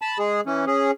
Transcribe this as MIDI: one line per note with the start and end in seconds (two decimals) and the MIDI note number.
0.02 0.18 81
0.02 0.18 83
0.19 0.41 56
0.19 0.41 68
0.46 0.65 52
0.46 0.65 61
0.67 0.91 61
0.67 0.91 68